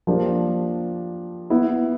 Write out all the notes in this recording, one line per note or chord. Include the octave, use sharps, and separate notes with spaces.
F3 A#3 D4 G4
B3 E4